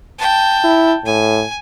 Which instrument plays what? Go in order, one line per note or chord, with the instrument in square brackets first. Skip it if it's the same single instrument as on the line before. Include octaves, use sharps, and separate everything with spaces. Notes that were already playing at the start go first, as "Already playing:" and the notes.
[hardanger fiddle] G5 A5
[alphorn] E4
[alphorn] A2 [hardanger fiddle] G#5